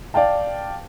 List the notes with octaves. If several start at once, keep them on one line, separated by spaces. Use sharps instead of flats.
D5 F5 G5 A5